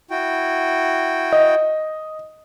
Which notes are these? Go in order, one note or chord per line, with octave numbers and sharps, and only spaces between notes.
E4 F#4 G5
D#5